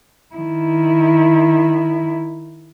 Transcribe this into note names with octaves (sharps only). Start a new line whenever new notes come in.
D#3 E4